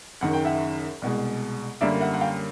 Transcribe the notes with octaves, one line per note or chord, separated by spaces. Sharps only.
F#1 F#2 D#3 F#5
G5
E5 F#5
C2 B2 G#3
F#2 D3 G3 A#3 D5 E5
E5 F#5
F#5
F5 G5